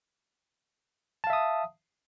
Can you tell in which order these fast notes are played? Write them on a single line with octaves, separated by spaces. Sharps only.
A5 F5 E5 D#6